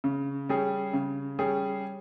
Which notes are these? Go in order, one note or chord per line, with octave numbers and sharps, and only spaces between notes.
C#3
G3 C#4 G#4
C#3
G3 C#4 G#4